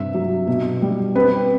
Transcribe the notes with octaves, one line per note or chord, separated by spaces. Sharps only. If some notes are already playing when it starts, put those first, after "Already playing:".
Already playing: G2 C3 E5
F#3
B2
G3
C4 B4